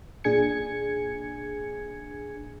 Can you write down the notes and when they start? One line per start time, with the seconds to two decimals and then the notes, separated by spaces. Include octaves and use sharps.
0.24 A#2 D4 G#4 G#5 G#6 C#7